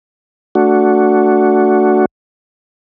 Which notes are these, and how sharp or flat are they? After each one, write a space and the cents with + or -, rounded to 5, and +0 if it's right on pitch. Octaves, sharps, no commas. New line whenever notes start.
A3 +5 D4 -15 F#4 +0